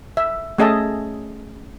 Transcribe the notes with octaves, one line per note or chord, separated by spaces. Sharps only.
E5
A3 C#4 G#4 D#5 E5 A5